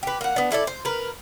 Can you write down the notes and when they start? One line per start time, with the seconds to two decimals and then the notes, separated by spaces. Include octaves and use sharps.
0.03 G4 B4
0.21 A#3 F#5
0.36 B3 D4
0.51 D4 E4 A4 D5
0.67 C5
0.85 A#4 B4